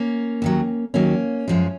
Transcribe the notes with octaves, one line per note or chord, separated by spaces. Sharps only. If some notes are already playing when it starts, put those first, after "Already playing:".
Already playing: A#3 C#4
D#2 D#3 F#3
D#2 D#3 F#3 A#3 C#4
F#2 F3 G#3